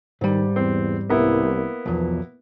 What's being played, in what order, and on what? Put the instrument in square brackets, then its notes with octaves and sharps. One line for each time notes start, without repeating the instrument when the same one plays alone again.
[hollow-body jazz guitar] G#2 G3 [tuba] D#3
[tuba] E2 [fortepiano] C4
[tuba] C2 [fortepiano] A#3 B3 E4
[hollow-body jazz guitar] B1 E2 [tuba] F3